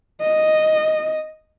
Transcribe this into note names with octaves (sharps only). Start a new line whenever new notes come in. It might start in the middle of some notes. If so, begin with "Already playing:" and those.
D#5